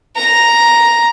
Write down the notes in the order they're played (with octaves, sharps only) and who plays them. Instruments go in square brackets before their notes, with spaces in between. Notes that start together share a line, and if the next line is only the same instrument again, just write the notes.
[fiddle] A#5